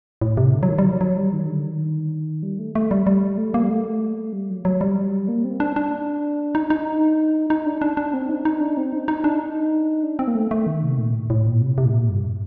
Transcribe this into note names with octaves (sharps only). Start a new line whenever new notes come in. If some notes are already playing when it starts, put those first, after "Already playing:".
A2
C3
D3
F#3
D#3
G3
F#3
F#3
G3
D#3
D3
D#3
G3
A3
A3
G3
G3
A3
A#3
G3
A3
G3
F#3
F#3
G3
A#3
C4
D4
D4
D#4
D#4
D#4
D4
D4
D4
C4
D#4
D#4
D4
C4
D#4
D#4
D4
D#4
D4
C4
A#3
A3
A3
D#3
C3
A#2
A2
A2
A#2
C3
C3
A2
A#2
G2